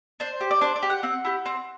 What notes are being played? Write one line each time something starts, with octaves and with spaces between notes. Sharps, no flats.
D4 C5
G4
D5
D4 C5
D5
G4
F#5
C4 F#5
E4 G4
C4